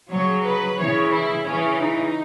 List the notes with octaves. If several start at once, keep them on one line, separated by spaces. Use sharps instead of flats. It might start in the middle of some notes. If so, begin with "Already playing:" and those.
C#3 F#3 C#5
B4
C#3 E3 C#5
E4
C#3 E3 C#4
D#4